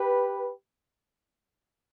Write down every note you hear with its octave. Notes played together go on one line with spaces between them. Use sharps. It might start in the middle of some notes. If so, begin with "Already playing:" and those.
Already playing: G4 B4